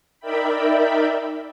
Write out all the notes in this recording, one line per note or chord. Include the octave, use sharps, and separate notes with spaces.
D#4 A#4 D5 E5 G5 B5